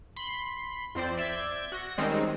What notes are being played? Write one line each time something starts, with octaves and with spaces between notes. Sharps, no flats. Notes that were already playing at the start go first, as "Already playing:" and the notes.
B5 C6
F2 C4 C5 D5
D5 E5 G6 G#6
F#4 A#6
D#3 G3 G#3 C4 C#4 D#4